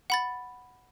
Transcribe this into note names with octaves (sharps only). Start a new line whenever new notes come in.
F#5 B5 A6